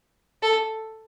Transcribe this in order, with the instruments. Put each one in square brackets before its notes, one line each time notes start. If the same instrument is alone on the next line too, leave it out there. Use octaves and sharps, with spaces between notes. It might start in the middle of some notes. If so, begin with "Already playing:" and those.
[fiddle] A4